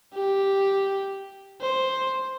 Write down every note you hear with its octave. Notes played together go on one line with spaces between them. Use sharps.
G4
C5